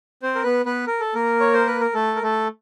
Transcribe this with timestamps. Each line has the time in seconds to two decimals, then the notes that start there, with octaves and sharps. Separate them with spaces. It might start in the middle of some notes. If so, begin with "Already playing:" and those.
0.23 C4 C5
0.35 A#4
0.43 B3 B4
0.66 B3 B4
0.87 A#4
1.00 A4
1.15 A#3 A#4
1.40 C#5
1.53 C5
1.67 B4
1.80 A#4
1.94 A3 A4
2.16 A#4
2.22 A3 A4